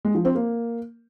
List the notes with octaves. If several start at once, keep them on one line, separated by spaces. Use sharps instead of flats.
G#3
F3
C4
A#3